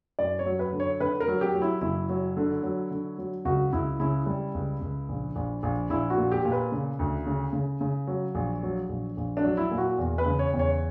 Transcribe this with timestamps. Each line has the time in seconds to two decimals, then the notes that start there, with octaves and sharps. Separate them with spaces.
0.19 F#2 D5
0.39 C#5
0.46 F#3
0.59 B4
0.73 D3
0.80 C#5
1.00 D3 B4
1.20 A#4
1.28 F#3
1.41 G4
1.54 F#3
1.62 E4
1.81 F#1 E4
2.09 F#3
2.37 D3
2.63 F#3
2.91 D3
3.18 F#3
3.45 C#2 F#4
3.73 C#2 E4
4.00 C#3 E4
4.26 G3
4.54 C#2
4.81 C#2
5.09 A#1
5.36 A#1
5.63 A#1
5.90 A#1 E4
6.10 F#4
6.17 A#2
6.31 G4
6.45 A#2
6.52 B4
6.72 C#3
6.99 D2
7.26 C#3
7.53 C#3
7.81 C#3
8.07 F#3
8.35 A#1
8.63 F#3
8.89 A#1
9.17 A#1
9.37 D4
9.44 F#3
9.57 E4
9.71 A#2
9.78 F#4
9.98 E2
10.18 B4
10.26 C#3
10.39 C#5
10.53 E2
10.59 C#5